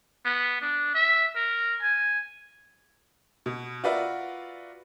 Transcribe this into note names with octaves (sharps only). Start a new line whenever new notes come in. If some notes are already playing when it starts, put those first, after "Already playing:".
B3
D4
E5
A#4
G#5
B2
F4 F#4 A#4 B4 D5 E5